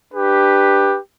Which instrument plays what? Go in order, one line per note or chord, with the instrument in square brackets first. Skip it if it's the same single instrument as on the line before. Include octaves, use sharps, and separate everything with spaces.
[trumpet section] D4 G4 B4